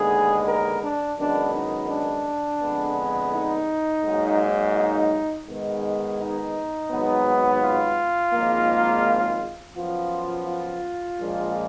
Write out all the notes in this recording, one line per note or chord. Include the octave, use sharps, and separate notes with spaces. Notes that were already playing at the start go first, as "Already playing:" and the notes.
Already playing: D#2 D3 G#3 B3 G#4
A#4
D4
F#2 D#3 G#3 B3 D4
D#4
D4
F2 D3 G#3 B3
D#4
G#2 F#3 A#3
D#4
G#2 D#3 G#3 B3
D#4
G#1 G#2 F#3 B3
F4
G#1 G#2 F3 A#3
F#2 F3 B3 F4
F4
A#1 A#2 F3 G#3